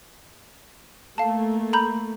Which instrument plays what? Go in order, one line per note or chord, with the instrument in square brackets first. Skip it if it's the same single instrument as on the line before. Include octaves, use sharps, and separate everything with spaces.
[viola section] A3 A#3 [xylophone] F5 A5
[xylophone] A#5 B5 G6